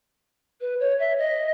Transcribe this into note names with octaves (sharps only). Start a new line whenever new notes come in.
B4
C#5
E5
D#5